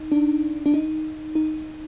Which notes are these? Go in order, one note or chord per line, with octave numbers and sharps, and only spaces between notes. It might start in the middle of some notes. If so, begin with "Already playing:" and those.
Already playing: D#4
D4
D4
D#4
D#4